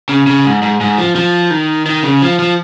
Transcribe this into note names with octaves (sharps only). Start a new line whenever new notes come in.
C#3
C#3
G#2
G#2
G#2
F3
F3
D#3
D#3
C#3
F3
F3